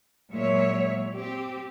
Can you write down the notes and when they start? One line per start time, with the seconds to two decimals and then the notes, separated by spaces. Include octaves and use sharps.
0.32 A#2 F#3 G#3 C#5 E5
1.16 C4 G4